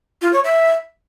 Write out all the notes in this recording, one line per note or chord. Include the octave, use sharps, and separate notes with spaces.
F4
C#5
E5